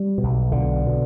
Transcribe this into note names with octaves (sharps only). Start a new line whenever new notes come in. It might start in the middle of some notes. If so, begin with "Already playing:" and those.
Already playing: G3
B2
B1
B1 B2 D3
B2